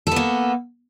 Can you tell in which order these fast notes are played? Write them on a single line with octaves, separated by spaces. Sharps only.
A4 B3 A#3